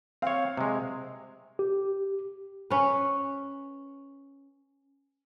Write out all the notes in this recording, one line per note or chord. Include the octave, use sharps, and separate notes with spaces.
C4 C#5 F5
C3 G#3
G4
C#4 B4